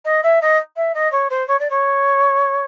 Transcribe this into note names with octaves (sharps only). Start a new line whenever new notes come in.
D#5
E5
D#5
E5
D#5
C#5
C5
C#5
D5
C#5